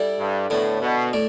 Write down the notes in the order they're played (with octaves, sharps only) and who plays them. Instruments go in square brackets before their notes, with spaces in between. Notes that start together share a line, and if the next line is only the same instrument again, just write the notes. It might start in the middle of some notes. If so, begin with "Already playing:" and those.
Already playing: [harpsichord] G3 E4 A4 D5
[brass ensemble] G2
[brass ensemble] A2 [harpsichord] D3 B3 E4
[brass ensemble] B2
[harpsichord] A2 A3 D5